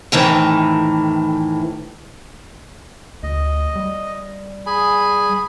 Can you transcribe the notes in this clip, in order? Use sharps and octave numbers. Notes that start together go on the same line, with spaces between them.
F2 A2 D#3 E3
D2 D#5
G3
G#4 G#5 B5